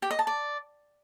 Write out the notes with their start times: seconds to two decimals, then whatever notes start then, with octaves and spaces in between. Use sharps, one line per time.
0.02 G4
0.11 D#5
0.19 A5
0.27 D5